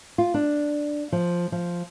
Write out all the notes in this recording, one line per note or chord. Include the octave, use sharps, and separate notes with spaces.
F4
D4
F3
F3